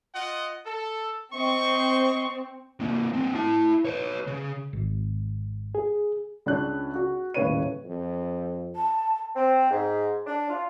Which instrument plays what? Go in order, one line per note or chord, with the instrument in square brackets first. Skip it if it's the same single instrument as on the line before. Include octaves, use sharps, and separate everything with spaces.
[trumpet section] F4 D#5 F#5
A4
[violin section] C4 [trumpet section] D#5 C6 C#6
[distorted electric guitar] C3 A#3
C4 D4
E4 A5
B4 C#5
C#3
[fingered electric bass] G#1
[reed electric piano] G#4
[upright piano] C#2 C#4 D4 F4 F#6
F#4
D#1 A2 C#3 B4 C#5 D#7
[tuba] F2
[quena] A5
[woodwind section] C4
G#2
D4
F4